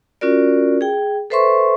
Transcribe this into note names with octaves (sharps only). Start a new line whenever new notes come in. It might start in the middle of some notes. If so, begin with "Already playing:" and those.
C#4 F4 F#4 A#4 D5
G#4 G5
A4 B4 C5 E5 C6 C#6